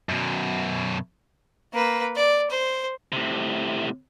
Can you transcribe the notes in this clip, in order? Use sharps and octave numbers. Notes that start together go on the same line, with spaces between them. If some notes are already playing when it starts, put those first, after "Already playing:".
F#2 B2
A#3 B4
D5
C5
A2 C3